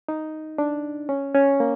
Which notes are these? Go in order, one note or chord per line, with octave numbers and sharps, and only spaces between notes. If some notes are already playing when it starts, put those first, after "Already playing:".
D#4
D4
C#4
C#4
A#3